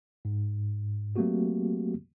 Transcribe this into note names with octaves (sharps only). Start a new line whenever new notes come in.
G#2
F#3 A3 A#3 C4 F#4 G4